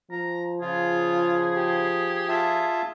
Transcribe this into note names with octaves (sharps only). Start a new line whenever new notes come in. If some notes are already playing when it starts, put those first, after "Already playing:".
F3 A#5
C#3 F4 G#4
G4
F4 E5 A5